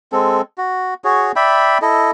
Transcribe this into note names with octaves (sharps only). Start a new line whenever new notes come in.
G#3 C4 A4
F#4
F#4 G#4 C#5
D5 E5 G5 B5
E4 A4 D#5